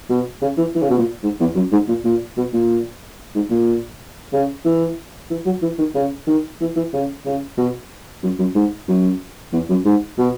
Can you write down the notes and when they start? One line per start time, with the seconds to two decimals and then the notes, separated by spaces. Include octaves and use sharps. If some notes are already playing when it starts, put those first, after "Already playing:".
0.10 B2
0.42 C#3
0.58 E3
0.75 E3
0.82 C#3
0.90 B2
0.99 A#2
1.23 G#2
1.40 E2
1.55 F#2
1.72 G#2
1.88 A#2
2.05 A#2
2.37 B2
2.54 A#2
3.35 G#2
3.50 A#2
4.33 C#3
4.65 E3
5.30 E3
5.46 F#3
5.62 E3
5.79 D#3
5.95 C#3
6.27 D#3
6.61 E3
6.76 E3
6.93 C#3
7.26 C#3
7.57 B2
8.23 F#2
8.39 F#2
8.55 G#2
8.88 F#2
9.53 E2
9.69 F#2
9.85 G#2
10.18 B2